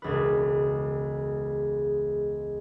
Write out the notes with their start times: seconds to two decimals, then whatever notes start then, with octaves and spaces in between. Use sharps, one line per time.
0.02 E1 C#2 B4